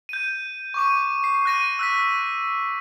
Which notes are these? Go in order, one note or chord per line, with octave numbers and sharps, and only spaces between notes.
G6 D#7
C#6 D6 D#7
C7
F#6 A#6 D#7
E6 F#6 B6